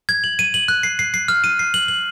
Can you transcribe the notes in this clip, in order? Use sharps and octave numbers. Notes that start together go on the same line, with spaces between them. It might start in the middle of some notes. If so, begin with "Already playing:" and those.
G#6
F#7
D#7
F#7
F#6
C7
C7
C7
F6
D#7
C7
F#7
F#7